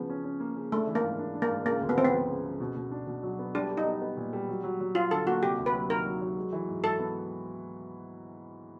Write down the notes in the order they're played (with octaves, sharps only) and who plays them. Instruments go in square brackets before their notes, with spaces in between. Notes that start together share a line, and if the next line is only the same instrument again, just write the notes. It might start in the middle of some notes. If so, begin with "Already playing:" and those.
Already playing: [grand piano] C#3 F3 [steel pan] B3
[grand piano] C#4
C#4
A#3
C#3
[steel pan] A3 [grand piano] D4
[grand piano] E3
[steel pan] A#3
[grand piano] G#2
D4
D4
[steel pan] A#3
[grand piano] G#2
[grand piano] C#3 [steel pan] A#3
[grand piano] D2
[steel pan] B3
[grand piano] F3 [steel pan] C4
[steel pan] B3
[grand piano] F3
C#3
C#3
B2
B2
D4
B2
F#3
B3
[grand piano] G3 [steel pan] D4
[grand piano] G3
[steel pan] D#4
[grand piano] B3
B3
A#2
G3
F#3
F#3
F#3
[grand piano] F#3 [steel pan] F4
[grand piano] D3 [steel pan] A4
[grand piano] A#3 [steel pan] F#4
[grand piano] C3 [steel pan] G4
[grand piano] D2
[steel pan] B4
[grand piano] F#3
[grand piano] D#3 [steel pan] A#4
[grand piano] F#3
F#3
G#3
E3
G#2
[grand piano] G#2 [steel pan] A4
[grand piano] B3